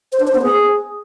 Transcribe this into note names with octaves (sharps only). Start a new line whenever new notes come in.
C5
D4
C5
B3
G#4